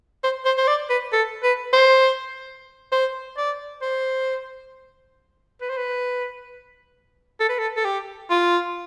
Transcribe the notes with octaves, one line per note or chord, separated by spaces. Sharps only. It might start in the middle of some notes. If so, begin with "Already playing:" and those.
C5
C5
C5
D5
B4
A4
B4
C5
C5
D5
C5
B4
C5
B4
A4
B4
A4
A4
G4
F4